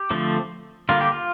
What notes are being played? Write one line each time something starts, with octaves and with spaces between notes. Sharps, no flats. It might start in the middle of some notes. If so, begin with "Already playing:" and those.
Already playing: G4
D3 F3 A3 C4
D3 G3 A#3 F4
G4
F4